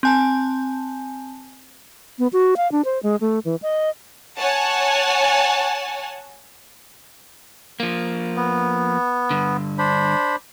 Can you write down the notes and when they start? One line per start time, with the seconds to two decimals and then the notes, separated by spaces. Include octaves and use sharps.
0.03 C4 G#5 A5
2.19 B3
2.33 F#4
2.57 F5
2.72 D4
2.85 C5
3.03 G#3
3.21 A3
3.45 E3
3.62 D#5
4.39 C#5 F#5 G#5 A5
7.80 F3 A#3
8.36 B3
9.30 G2 D3
9.78 D4 C5 B5